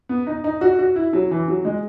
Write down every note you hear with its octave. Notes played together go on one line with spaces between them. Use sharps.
B3
D#4
D#4
F#4
F#4
E4
F#3
E3
F#3
G#3